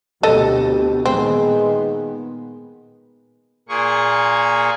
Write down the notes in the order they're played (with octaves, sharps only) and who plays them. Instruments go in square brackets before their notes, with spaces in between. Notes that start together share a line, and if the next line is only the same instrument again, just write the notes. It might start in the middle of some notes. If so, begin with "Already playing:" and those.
[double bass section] D2 B2 C4 [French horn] G4 [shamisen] A4 D#5
[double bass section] A#2 D#3 B3 [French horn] G#3 [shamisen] C4
[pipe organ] A#2 A#3 G#4 C#6